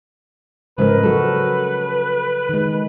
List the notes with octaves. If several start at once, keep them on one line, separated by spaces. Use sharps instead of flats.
G#2 C#3 F3 A#4 B4
F#3 F#4 A4
D#3 G#3